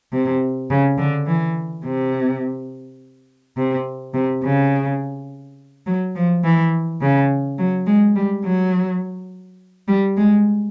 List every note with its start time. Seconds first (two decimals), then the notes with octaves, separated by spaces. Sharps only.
0.12 C3
0.70 C#3
0.98 D3
1.27 E3
1.84 C3
3.57 C3
4.14 C3
4.43 C#3
5.86 F#3
6.15 F3
6.44 E3
7.01 C#3
7.58 F#3
7.87 G#3
8.15 G3
8.44 F#3
9.88 G3
10.17 G#3